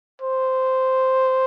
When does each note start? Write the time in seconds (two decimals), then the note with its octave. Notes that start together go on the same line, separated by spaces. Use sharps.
0.22 C5